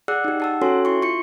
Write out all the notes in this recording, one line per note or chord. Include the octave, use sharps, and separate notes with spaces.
G#4 D5 F#5 E6 F#6
D#4 G4
F#5 A5 E6
C#4 F#4 A4 C#5 G#5 C6
E4 C6 C#6
F4 C#6 C#7